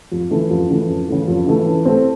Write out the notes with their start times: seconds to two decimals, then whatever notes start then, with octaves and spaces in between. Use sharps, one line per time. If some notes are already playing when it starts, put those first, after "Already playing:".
0.12 F2
0.31 C#3 E3 A3
0.50 F2
0.69 C#3 E3 A3
0.89 F2
1.08 C#3 E3 A3
1.28 F2
1.47 C#3 E3 A3
1.66 E3
1.85 A3 C4